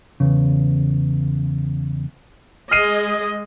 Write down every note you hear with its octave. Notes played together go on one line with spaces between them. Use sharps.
E2 C#3
G#3 G#4 D#5 F6 C7 D#7